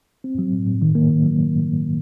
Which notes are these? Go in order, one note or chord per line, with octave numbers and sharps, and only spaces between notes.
C4
F#3
A2
A2
D#3
A#3
D#3
F#3